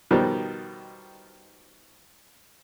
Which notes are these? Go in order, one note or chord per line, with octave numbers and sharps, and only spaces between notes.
B2 D#3 F3 G3